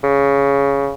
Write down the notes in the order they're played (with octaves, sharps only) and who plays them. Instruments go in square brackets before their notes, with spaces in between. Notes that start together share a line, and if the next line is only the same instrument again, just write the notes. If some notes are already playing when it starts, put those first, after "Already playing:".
[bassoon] C#3